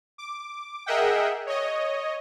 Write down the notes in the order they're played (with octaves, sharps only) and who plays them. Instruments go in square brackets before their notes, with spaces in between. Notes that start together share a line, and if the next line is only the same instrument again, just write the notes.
[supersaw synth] D6
G#4 A#4 D#5 E5 F#5 G5
C#5 D#5